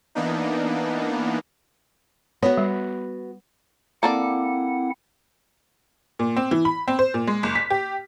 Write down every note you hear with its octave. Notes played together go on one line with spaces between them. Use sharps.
E3 A#3 B3 D4 D#4
B3 F#4 C#5
G3
A#3 C4 E4 A4 D5 F#5
A#2
C4
E3
B5
C4
C5
A#2
G#3
F#1
B6
G4